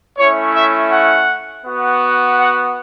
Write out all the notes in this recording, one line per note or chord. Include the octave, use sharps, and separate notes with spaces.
A3 C#4 E4 C#5
E5
F#5
B3 F#4
F#5